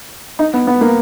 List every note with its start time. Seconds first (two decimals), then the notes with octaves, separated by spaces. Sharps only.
0.39 D#4
0.54 B3
0.67 B3
0.81 A#3